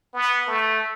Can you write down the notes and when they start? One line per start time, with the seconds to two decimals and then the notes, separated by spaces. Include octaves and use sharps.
0.14 B3
0.47 A3